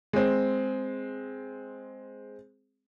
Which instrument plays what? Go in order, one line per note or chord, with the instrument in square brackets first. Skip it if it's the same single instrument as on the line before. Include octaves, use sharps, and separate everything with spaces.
[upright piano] G#3 C4